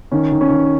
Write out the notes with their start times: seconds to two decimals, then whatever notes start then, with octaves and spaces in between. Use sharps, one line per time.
0.12 D#3 C#4
0.32 D#3
0.41 C#4
0.50 D#3